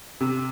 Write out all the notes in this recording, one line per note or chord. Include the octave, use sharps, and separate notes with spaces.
C3